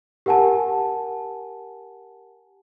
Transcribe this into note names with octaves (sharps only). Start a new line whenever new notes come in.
G4 A#4 F#5 G#5 A5